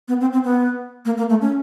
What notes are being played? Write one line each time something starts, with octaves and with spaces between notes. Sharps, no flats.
B3
C4
C4
B3
A#3
A#3
A3
C#4